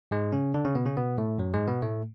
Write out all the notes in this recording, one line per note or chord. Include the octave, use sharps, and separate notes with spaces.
G#2 G#3
C#3 C#4
D3 D4
C#3 C#4
B2 B3
C#3 C#4
B2 B3
A2 A3
F#2 F#3
G#2 G#3
B2 B3
A2 A3